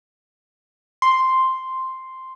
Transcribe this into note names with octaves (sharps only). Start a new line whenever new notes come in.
C6